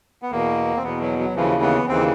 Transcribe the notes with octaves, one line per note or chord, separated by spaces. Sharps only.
B3
E2 B2 A#3
C4
E2 B2 B3
F#3
F#3
D#2 C#3 E3 F3
B3
D#2 C#3 E3 C4